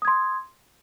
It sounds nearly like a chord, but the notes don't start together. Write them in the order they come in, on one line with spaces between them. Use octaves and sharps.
D#6 G#6 C6